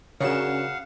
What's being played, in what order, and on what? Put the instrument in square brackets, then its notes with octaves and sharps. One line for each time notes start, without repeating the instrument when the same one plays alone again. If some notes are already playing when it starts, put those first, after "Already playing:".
[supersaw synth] C#3 E7 [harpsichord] F#3 D4 A#4 [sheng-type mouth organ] F5 F#5